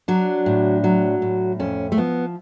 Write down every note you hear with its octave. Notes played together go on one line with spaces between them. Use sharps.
F#3 D4
A2
F#3
A2
F2 C#4
A3
F3 B3